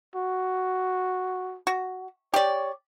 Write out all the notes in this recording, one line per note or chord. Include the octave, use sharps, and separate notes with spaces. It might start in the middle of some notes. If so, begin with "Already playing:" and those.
F#4
F#4
G4 C#5 D5